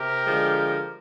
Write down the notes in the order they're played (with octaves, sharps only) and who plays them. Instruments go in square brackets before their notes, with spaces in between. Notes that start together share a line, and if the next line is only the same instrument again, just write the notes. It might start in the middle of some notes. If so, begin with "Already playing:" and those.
Already playing: [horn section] C3 G4 A#4
D3 F3 G#3